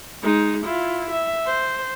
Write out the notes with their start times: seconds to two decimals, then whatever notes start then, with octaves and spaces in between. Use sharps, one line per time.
0.22 G#3 D#4
0.65 E4 F4
1.11 E5
1.46 C5